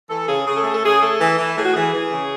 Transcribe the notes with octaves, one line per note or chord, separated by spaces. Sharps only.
E3 A4
C#3 G#4
C#3 G#4
A4
A3 G#4
A4
C#3 G#4
A3 A4
E3
E3
A2 G#4
F#4
E3 G#4
E3
C#3